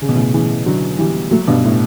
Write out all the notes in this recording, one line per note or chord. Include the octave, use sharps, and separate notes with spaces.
C#3
B2
A2 C#3
C#3 E3
D3 F#3
E3 G3
F#3 A3
G2 B2
A2